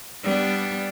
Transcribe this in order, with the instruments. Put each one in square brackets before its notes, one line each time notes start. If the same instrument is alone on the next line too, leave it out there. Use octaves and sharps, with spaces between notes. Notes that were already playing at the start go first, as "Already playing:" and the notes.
[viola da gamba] G3 B3 D4